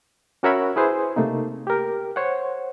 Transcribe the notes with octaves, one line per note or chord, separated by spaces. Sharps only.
C#4 F#4 A#4 C#5 E5 B5
E4 G#4 B4 C5
C3 A3 A#3 D#4
G4 A#4
C5 C#5 F#5